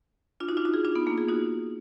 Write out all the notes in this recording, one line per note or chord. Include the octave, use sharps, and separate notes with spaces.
D4 F4
D#4 F#4
D4 F4
D#4 F#4
F4 G#4
D4 F4
B3 D#4
A#3 D4
F4 G#4
D#4 F#4